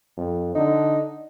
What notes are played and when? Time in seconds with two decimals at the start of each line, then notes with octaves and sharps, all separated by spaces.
0.17 F2
0.55 D3 D#4